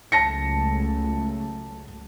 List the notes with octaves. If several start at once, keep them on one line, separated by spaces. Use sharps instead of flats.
C#2 F#3 A3 A5 A#6 C#7